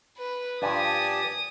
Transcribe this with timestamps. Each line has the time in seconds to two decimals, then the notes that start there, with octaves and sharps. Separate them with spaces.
0.18 B4
0.62 G2 F3 G4 D5 G#5 A5 D#6